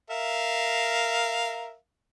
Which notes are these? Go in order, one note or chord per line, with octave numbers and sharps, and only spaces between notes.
A#4 E5 F5